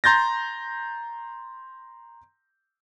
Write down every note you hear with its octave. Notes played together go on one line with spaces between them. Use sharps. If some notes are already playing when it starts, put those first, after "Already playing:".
A#5 C6 G6 A6 A#6